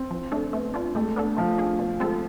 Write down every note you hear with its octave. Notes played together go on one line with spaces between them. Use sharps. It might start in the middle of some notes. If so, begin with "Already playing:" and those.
Already playing: C4
F3
A3 D4 A4
A3 B3
D4 F4
G#3 A3
B3 D4 A4
F3 A3
D4 G#4
B2
G#3 C4 F4 A4